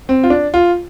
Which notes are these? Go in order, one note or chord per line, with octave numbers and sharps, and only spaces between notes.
C4
F4
D4
F4